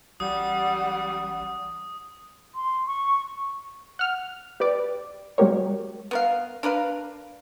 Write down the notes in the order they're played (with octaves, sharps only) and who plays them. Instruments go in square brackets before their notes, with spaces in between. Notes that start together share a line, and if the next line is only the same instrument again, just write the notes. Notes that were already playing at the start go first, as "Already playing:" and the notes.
[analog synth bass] A1 [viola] G3 [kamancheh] F#5 [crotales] D#6
[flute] C6
C#6
[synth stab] F#5 F6
G4 B4 D5
G3 G#3 F#4 G4 A#4 C#5
[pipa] B3 A#4 F5
D4 A#4 B4 F5